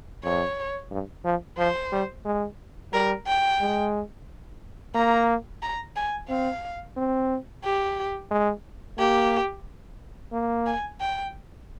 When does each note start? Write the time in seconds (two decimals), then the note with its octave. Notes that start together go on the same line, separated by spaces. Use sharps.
0.24 F2 C#5
0.91 G2
1.25 F3
1.58 F3 C5
1.92 G3
2.26 G#3
2.93 G3 A#4
3.26 G5
3.61 G#3
4.95 A#3 A#5
5.62 A#5
5.96 G#5
6.29 C4 F5
6.97 C4
7.64 G4
8.31 G#3
8.98 A#3 G4
10.33 A#3
10.66 G#5
11.01 G5